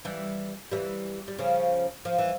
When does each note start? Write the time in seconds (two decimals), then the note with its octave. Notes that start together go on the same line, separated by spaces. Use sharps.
0.05 E3 G3
0.72 E3 G3
1.28 G3
1.38 C#3 F3
2.05 F3
2.18 E3